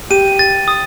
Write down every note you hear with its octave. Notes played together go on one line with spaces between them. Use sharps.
G4 D#7
A6
D#6